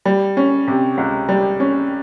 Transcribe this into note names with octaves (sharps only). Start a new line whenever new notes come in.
G3
C#4
C3
C#2
G3
C#4